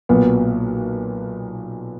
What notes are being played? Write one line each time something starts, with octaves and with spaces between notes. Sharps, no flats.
B1 A#2 F#3 B3